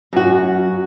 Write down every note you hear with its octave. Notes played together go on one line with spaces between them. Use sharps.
F#2 F#4